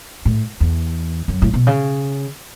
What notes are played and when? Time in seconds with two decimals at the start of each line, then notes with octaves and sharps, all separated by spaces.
0.25 A2
0.61 E2
1.28 F#2
1.42 A2
1.54 B2
1.67 C#3